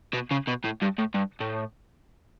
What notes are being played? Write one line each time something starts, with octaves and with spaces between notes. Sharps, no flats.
B2
C#3
B2
A2
G2
A2
G2
A2